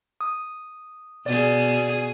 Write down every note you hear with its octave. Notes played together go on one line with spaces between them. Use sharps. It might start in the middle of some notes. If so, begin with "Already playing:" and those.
D#6
B2 G#4 D5